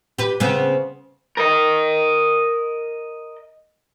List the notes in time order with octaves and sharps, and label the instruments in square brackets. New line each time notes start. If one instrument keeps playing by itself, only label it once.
[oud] G4 B4
C#3 B3 C4
[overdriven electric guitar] A#4 D#5